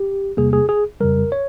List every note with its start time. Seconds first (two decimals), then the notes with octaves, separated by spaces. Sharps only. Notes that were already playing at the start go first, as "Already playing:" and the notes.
Already playing: G4
0.37 E2 C3 G3 A#3 G#4
0.53 G#4
0.69 G#4
1.01 F2 C#3 G3 A#4
1.32 C#5